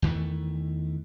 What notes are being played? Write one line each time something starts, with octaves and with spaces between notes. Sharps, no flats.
E2 D#3 E3 A3